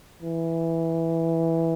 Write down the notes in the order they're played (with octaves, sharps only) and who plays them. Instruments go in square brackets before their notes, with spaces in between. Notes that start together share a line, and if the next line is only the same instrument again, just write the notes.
[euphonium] E3